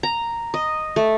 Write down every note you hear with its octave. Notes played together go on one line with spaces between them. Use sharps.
A#5
D#5
A3